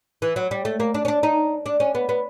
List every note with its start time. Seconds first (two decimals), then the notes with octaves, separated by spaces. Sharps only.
0.22 E3
0.36 F#3
0.51 G3
0.65 A3
0.80 A#3
0.94 D4
1.05 C#4
1.08 D4
1.23 D#4
1.66 D4
1.80 C#4
1.95 B3
2.09 B3